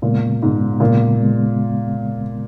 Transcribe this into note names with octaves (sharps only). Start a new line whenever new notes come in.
A#2 C#3 G#3 B3
G#2 C#3 G#3 B3
A#2 C#3 G#3 B3
C#3 G#3 B3